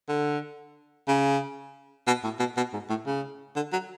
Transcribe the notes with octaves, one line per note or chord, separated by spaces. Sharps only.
D3
C#3
B2
A2
B2
B2
G#2
A2
C#3
D3
F#3